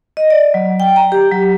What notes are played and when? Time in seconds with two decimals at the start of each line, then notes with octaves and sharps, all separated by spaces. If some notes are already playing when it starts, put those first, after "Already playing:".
0.17 D#5
0.30 D5
0.54 F#3
0.80 G5
0.96 A#5
1.12 G4
1.31 F#3